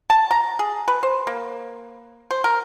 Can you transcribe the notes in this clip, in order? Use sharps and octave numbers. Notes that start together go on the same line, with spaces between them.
A5
A#5
G#4
B4
C5
A#3
C5
A#4